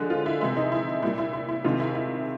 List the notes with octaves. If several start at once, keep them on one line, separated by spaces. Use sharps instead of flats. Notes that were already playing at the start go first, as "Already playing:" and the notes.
Already playing: D3 F3 G#3
F4
E4
C3 E3 G#3 E4
D#4
E4
A#2 G3 E4
E4
E4
E4
C3 D#3 G#3 F4
E4
E4